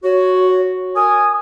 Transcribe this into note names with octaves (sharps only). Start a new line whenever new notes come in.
F#4 C#5
A#4 G#5 D#6